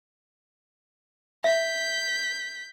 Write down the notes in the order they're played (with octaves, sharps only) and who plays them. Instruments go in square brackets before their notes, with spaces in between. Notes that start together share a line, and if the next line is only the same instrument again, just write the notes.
[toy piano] E5 [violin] G6 B6